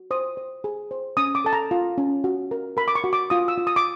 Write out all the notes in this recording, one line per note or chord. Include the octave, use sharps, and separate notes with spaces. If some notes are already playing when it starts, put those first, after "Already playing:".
Already playing: F#4
C5 D#6
C5
G#4
C5
C#4 D#6
D6
A4 A5
A#5
F4
C#4
F#4
A#4
A#4 B5
D6
C#6
F#4
D6
F4 D#6
E6
F4
D#6
D6